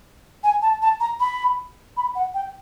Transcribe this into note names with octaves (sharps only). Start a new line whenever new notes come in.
G#5
A5
A5
A#5
B5
B5
F#5
G5